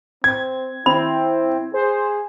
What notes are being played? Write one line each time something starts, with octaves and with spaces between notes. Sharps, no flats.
C4 G#6
C4 E4 B5
G#4 C5